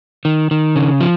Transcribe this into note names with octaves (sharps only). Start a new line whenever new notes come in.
D#3
D#3
C#3
F3